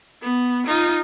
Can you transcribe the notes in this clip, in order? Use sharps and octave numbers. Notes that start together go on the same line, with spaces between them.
B3
D#4 F4